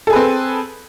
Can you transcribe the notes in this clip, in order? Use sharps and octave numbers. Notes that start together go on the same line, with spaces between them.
C4 G#4 A4 B4